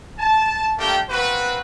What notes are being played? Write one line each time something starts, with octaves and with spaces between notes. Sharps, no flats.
A5
A3 A#3 D4 G4 A#4 G5
A#3 C4 F#4 B4